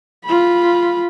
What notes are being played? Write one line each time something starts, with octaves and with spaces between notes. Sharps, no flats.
F4 B5